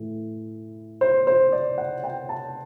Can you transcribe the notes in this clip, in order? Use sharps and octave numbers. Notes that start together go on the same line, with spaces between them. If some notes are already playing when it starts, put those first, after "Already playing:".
Already playing: A2 E3 A3
C5
C5
D5
F#5
G5
A5